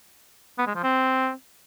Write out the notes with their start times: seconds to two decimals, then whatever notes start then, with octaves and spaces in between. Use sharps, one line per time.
0.59 B3
0.67 G#3
0.75 F3
0.84 C4